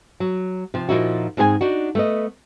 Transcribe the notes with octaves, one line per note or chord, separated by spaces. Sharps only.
F#3
C3 F3
A#2 D#3 F3 D#4 E4 F#4
G#2 C4 G#4 A#4 G#5
D4 D#4 F#4
A3 B3 D#5